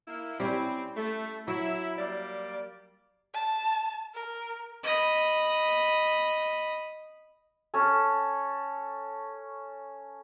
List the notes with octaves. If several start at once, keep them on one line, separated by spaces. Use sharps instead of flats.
A#3 E4
G3 C4 C#4 E4
A3
F#3 E4
G3 A#3 D5
A5
A#4
D#5 B5
C#4 A4